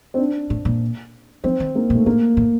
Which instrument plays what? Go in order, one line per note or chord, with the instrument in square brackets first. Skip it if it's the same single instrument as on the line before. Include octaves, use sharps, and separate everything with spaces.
[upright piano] C4
D4
[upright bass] A2
A#2
[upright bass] F3 [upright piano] C4
[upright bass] D#3
[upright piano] A#3
[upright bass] A#2
[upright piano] A3
[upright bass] A2 [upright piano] A#3
[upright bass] A2